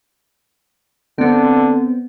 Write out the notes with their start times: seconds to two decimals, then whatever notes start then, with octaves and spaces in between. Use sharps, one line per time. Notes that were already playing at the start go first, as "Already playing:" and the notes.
1.18 D3 B3 C4